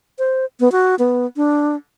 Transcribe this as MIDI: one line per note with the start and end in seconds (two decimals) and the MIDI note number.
0.19 0.45 72
0.60 0.71 59
0.72 0.95 66
0.99 1.26 59
1.36 1.76 62